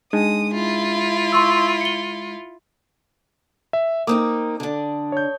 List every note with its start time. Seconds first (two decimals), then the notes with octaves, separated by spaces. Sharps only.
0.13 G#3 D4 D#4 D#6
0.53 E4 F4
1.32 C6 C#6 E6
1.81 C#7 G7
3.73 E5
4.07 A#3 C4 D#4 D6 D#6
4.60 D3 D4
5.12 C#5 G6